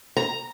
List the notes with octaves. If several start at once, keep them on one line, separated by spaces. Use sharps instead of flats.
A#5